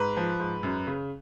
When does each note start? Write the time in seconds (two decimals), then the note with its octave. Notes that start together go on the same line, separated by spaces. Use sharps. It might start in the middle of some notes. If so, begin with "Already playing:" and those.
Already playing: G#2 B4
0.17 F3
0.40 G#2
0.63 F#2
0.87 C#3